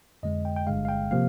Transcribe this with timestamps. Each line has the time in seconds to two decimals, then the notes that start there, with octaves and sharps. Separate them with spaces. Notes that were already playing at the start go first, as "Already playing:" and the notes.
0.23 F2 D3 G#3 D#5
0.45 G5
0.56 G5
0.67 G1 G2 D3 G#3 F5
0.85 F5
0.89 G5
1.11 C3 F3 A#3 F5